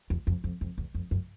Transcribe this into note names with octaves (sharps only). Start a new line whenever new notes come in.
E2
F2
F2
F2
E2
F2
F#2